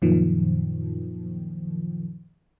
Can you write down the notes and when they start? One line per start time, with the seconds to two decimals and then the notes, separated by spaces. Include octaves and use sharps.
0.02 F#2 A#2 D#3 F3